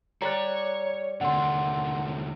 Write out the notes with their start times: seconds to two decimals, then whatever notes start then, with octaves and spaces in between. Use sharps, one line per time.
0.22 G3 C#5 D5 A#5 F#6
1.21 D#2 D3 F#5 C6